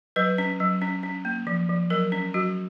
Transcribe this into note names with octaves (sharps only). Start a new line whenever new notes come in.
F#3 B4
C#4
F#3
C#4
C#4
A#3
F3
F3
F#3 A#4
C#4
F#3 F#4